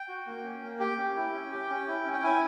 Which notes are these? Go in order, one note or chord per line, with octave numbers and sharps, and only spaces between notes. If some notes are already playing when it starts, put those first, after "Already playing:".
Already playing: G5
F#4
A#3
C#4
A#3
G4 G5
C#4
E4
C#4
G4
C#4
E4
C#4
G5
E4 G#5